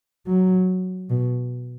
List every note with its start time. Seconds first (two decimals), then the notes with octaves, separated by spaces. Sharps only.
0.27 F#3
1.10 B2